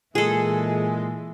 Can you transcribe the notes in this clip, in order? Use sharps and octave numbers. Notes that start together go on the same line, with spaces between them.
A#2 E3 G#3 G#4 A4